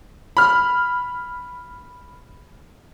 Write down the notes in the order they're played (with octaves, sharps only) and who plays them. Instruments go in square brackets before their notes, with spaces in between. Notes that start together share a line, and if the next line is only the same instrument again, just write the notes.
[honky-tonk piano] B5 F6